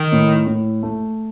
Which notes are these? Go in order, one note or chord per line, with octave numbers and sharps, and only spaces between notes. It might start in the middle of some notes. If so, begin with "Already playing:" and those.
Already playing: D#3
A2
A2
A3